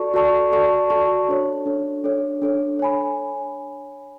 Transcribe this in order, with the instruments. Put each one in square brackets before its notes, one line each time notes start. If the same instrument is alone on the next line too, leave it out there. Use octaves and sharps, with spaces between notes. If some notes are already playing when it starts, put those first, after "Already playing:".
Already playing: [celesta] F#4 A4 D5 A5 C#6
F#4 A4 D5 A5 C#6
F#4 A4 D5 A5 C#6
F#4 A4 D5 A5 C#6
D4 A4 C#5
D4 A4 C#5
D4 A4 C#5
D4 A4 C#5
C#5 G#5 B5